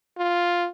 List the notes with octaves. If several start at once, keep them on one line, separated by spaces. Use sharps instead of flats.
F4